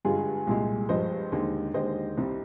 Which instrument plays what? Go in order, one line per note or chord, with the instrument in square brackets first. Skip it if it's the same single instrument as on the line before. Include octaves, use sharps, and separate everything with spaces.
[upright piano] G2 D3 G#3 F4 G#4
C2 A#2 G#3
G2 F3 G#3 C5 D#5
D#2 D3 G#3
D#2 D3 G#3 C5 D#5
C2 C3 G3